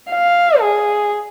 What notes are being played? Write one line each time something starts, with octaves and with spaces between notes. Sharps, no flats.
F5
G#4